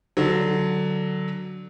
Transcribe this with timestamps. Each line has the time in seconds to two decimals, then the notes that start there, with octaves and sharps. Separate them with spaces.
0.17 D3 F#3